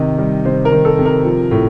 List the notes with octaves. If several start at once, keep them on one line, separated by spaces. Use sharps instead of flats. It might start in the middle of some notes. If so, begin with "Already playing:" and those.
Already playing: C3 D#3 D#5
G3
C3 C5
A#4
D#3
A4
C3
A#4
F3
A2